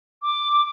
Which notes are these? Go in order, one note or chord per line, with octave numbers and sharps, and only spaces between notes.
D6